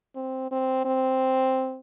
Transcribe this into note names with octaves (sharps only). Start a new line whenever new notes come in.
C4
C4
C4